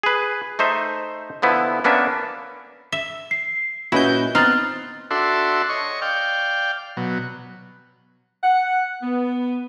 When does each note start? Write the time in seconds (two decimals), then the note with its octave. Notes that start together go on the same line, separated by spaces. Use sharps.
0.03 G#4 B4
0.59 A3 D#4 C5 E5
1.42 D3 F3 B3 E4
1.84 A#3 B3 C#4 D4 E5
2.92 E5
3.31 C7
3.92 A#2 C#4 E4 F#4 B4 D#5 G6
4.35 B3 C4 D#4 C6 F6 F#6 A6
5.11 D4 F#4 A4 E5 C6
5.69 C#5 D#5 C#6
6.02 D5 F5 G5
6.97 B2 F#3
8.44 F#5
9.02 B3